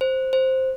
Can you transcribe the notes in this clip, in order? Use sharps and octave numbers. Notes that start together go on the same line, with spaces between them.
C5
C5